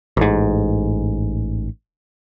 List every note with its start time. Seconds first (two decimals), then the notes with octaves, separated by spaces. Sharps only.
0.17 A1 G#2